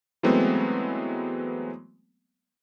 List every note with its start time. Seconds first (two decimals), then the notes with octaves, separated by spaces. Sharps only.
0.23 E3 F#3 G#3 A3 B3 C4